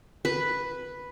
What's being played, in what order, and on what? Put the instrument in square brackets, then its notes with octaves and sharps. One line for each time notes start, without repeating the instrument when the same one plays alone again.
[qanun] B4